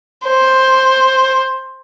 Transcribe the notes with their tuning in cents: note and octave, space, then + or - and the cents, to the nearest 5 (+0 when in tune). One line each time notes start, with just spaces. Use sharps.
C5 +5